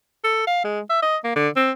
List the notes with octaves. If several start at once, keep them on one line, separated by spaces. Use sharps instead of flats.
A4
F5
G#3
E5
D#5
A#3
D3
C4